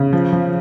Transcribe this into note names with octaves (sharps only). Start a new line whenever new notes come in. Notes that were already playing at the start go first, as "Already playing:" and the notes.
Already playing: C#3
F3
F3